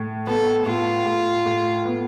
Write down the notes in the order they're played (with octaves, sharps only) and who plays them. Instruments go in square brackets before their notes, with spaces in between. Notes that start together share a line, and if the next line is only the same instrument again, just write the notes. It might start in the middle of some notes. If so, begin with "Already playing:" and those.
Already playing: [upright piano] A2
[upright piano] B3 [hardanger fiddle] A4
[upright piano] A2 [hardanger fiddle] F4
[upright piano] A2
A2
B3